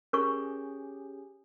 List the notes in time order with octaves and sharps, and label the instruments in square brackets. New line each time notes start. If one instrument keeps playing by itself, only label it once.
[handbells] C#4 G4 G#4 [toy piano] A#4 C#6